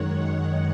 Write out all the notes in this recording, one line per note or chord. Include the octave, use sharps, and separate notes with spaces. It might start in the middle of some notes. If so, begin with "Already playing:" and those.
Already playing: F#2 D#3 G#3 C#5 F#5